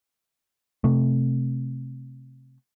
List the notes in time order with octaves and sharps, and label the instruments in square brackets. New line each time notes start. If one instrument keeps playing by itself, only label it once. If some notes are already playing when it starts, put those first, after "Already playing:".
[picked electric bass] C3 A3